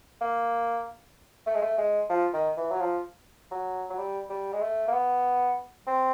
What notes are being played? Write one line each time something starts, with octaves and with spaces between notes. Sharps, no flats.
A#3
A3
G#3
A3
G#3
F3
D#3
E3
F#3
F3
F#3
F#3
G3
G3
G#3
A3
A#3
B3
C4